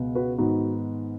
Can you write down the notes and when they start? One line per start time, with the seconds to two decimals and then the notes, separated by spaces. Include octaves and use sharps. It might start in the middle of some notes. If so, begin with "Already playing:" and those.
Already playing: C#2 B2 B3
0.15 F#4 B4
0.38 G#2 D#3 B3 D#4 F#4